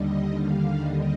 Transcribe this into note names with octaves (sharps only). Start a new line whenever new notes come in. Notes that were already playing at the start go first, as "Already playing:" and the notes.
Already playing: D#2 D3 G3 D#5
F5
D#5